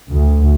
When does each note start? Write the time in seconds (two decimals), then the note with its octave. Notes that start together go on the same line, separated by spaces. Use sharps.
0.10 D2